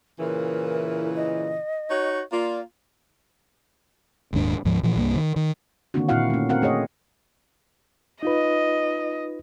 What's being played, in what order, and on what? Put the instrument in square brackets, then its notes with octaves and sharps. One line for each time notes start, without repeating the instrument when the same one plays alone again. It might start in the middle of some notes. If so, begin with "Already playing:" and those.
[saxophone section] A#2 C#3 E3 [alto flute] A#4
[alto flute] D#5
[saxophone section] D#4 F#4 C#5
[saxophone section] A#3 F4 [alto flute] D5
[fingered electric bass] D#1 D#2 G#2 D4
D2 G#2 F3
A#2 E3 F3
C2 G2 A#3
D#3
D#3
[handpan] D3 D#3 A#3 C4 D4 F#4
A#2 C4 E4 F#4 F5 F#5
A3 C#4
C4 F#4 A#4 F5 F#5
A3 G#4 C#5 D#5
[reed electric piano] D#4 F4 B4 [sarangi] D#5